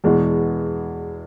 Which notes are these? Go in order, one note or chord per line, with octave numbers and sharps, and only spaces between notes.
E2 B2 G#3